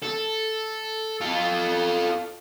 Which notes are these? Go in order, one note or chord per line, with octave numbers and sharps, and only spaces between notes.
A4
F4 A4